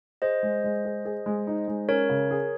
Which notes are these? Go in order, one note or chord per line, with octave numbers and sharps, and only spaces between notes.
G#4 C5 D#5
G#3
G#3
G#4
G#4
G#3
D#4
G#3
C#4 A#4 C#5
C#3
G#4